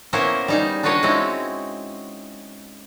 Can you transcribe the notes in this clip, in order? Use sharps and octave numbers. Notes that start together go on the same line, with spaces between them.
A#3 B3 C#4 E4 A#4 C5
G3 D#4 G#4
D4 F4 F#4 B4 C#5 D#5
G#3 C4 C#4 D#4 E4